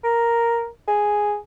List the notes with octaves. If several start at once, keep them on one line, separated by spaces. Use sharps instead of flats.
A#4
G#4